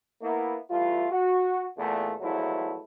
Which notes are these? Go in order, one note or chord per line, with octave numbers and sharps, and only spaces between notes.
A#3 B3 E4
E3 G3 A3 F4
F#4
E2 A#2 A3
E2 G#2 F3 F#3 A3 E4